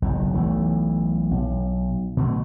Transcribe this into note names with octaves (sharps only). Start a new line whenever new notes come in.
F#1 B1 E2
B1 E3 A3
B1
B2 D3 E3 A3